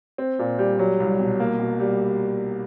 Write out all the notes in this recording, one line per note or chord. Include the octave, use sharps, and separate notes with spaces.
C4
A#2
G3
F#3
C2
B2
A#3
B2
G3